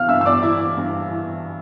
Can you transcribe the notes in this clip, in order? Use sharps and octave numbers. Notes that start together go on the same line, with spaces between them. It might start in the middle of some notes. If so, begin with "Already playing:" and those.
Already playing: E3 F5 F6
G2 E5 E6
E6
D5 D6
E3 E4 E5
G2
E3